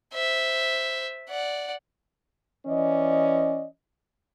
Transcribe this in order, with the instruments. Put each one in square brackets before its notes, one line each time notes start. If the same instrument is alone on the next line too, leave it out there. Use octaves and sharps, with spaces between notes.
[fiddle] C5 E5
D5 F#5
[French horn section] E3 C#4 D5 D#5